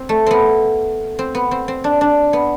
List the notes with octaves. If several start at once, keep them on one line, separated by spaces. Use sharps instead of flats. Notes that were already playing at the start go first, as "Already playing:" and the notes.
Already playing: C4
A3
B3 C4
C4
B3
C4
C4
D4
D4
B3